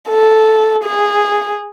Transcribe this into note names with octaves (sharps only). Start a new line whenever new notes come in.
A4
G#4